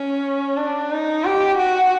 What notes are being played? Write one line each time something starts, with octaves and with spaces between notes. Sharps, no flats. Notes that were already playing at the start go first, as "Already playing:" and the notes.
Already playing: C#4
D4
D#4
G4
F#4